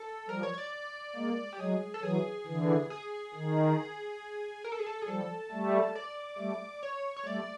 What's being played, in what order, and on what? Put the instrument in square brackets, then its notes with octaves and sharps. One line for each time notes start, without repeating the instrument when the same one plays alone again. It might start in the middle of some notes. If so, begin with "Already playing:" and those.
Already playing: [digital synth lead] A4
[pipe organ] F3 G3 [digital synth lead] A#4
[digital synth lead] C#5
C#5
D5
[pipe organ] G#3 A#3
[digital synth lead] G4
[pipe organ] F#3 G#3 [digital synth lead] G#4
[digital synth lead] A4
[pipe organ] E3 F#3 [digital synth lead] G#4
[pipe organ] D3 E3
[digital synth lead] G#4
[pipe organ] D#3
[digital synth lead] A#4
A4
G#4
A4
G#4
[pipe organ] F3 G3 [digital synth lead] A4
[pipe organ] G3 A3
[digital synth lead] D5
[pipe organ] G3 A3
[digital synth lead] C#5
C#5
[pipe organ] G3 A3 [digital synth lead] D5